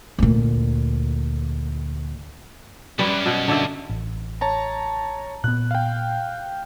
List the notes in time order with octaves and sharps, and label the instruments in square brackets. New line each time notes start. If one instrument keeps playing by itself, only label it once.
[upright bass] D2 A#2
[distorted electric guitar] B1 F#2 [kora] G3 B4 D5
[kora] B2
D3 D5 E5
[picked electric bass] A1
[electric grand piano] C#5 A5 A#5
[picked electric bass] A#2 B3 [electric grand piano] F#6
[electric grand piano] F5 G5